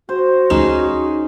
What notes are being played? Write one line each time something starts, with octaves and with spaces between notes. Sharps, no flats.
F#4 C5
D2 F3 C#4 D#4 G#4 E7